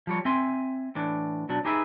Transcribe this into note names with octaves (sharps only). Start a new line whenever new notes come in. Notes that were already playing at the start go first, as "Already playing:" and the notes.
F3 G3 C#5
C4 E5 G#5 C6
A2 E3 D4
B2 F#3 D4
D#4 G4 G#4 B4 E5